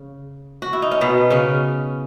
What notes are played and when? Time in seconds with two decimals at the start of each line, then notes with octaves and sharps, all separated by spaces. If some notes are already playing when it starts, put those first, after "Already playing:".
Already playing: C#3
0.62 F#4
0.73 E4
0.82 D#4
0.91 C#4
1.01 B2 B3
1.30 C#3 C#4